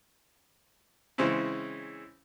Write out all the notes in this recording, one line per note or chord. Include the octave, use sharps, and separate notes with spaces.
C#3 E3 G#3 C4 C#4 E4